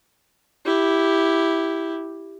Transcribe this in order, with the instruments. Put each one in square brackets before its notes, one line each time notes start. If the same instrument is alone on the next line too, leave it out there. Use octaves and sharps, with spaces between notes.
[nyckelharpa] E4 G4